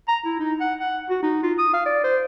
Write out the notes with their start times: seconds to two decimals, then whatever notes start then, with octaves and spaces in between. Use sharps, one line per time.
0.08 A#5
0.25 E4
0.40 D#4
0.61 F#5
0.80 F#5
1.10 F#4
1.23 D#4
1.43 F4
1.58 D#6
1.73 F5
1.86 D5
2.04 C5